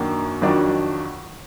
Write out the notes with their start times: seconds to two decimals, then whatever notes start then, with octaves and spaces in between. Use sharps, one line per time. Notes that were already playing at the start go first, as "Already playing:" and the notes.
Already playing: F#2 D#3 A#3 D4 F#4
0.42 F2 D#3 F#3 D4 F#4